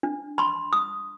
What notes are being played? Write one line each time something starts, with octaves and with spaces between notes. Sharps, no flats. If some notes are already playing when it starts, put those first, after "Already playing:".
D4
B5 C6
D#6